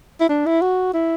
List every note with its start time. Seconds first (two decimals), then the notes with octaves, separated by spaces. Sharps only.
0.21 E4
0.29 D4
0.46 E4
0.61 F#4
0.93 E4